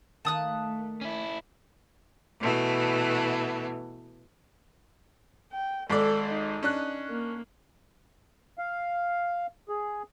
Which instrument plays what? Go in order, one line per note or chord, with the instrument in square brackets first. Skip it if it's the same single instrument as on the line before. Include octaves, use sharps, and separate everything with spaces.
[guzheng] D#3 A#3 [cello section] A3 [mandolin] A5 D#6 F#6
[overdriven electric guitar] C#4 E4
[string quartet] B2 E3 A3 B3
[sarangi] G5
[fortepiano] G#1 G#2 D5 [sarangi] A4
[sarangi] D#4
[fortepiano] C#4 D4 F#6
[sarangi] A#3
[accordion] F5
G#4